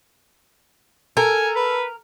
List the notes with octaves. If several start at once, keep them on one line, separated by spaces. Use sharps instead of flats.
A4 A#4 G#5
B4